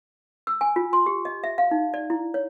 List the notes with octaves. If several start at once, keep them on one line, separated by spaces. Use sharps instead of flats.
E6
G#5
F4
C6
G4
D#5
E5
F5
D#4
D5
E4
C#5